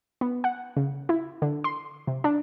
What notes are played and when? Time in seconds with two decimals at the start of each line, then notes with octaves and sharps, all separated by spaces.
0.21 B3
0.44 F#5
0.77 C#3
1.09 E4
1.42 D3
1.64 C6
2.07 C3
2.24 D4